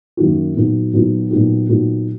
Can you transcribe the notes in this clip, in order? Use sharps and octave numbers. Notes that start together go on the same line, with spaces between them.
F#2 D#3 A#3 D#4 F#4
A#2 F#3 B3 D#4 F#4
A#2 F#3 B3 D#4 F#4
A#2 F#3 B3 D#4 F#4
A#2 F#3 B3 D#4 F#4